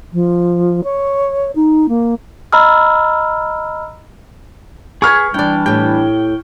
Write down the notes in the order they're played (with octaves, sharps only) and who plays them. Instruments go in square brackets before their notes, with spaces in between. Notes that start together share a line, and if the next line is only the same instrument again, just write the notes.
[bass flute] F3
C#5
D#4
A#3
[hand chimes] D#5 A#5 B5 E6 F6
[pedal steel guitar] G#4 B4 G#5 [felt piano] C#6 F6 G#6
[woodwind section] E3 G3 D4 [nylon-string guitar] E4 D5 [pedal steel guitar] G5
[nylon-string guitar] A2 G4 [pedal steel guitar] G5